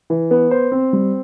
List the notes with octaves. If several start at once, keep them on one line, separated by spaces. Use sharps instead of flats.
E3
B3
C5
C4
G3